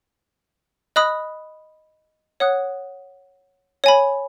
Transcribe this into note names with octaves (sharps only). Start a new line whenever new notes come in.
D#5 B5 D#6 F#6
C#5 F#5 D#6 F#6
C#5 G#5 B5